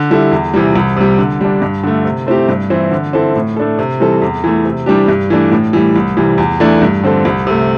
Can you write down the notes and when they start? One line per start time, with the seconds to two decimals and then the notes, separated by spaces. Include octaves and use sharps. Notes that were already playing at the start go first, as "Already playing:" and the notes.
Already playing: D3
0.10 G3 E4 A4
0.32 E2
0.54 C3 E3 G3
0.76 C2
0.97 C3 G3
1.18 D3
1.41 G3 D4
1.62 G2
1.83 D3 A3
2.05 C3
2.27 A3 C4 E4 G4
2.49 G2
2.70 E3 C4 E4
2.91 D3
3.13 C4 E4 A4
3.36 A2
3.56 A3 D4 A4
3.79 C3
4.00 E3 G3 C4 A4
4.22 E2
4.44 E3 A3
4.65 C3
4.86 E3 G3 D4 G4
5.08 G2
5.30 E3 A3 D4
5.51 A2
5.73 E3 G3
5.96 C2
6.17 C3 E3 G3
6.38 E2
6.60 E3 A3 D4
6.82 G2
7.03 D3 C4 A4
7.25 C2
7.47 C3 A3